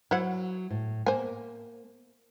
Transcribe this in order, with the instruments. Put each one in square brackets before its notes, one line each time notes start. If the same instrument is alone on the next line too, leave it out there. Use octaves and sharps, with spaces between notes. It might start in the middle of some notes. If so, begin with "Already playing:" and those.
[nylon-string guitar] F#3 [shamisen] E4 C5 F#5
[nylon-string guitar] A2
[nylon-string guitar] A#3 [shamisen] C5 G#5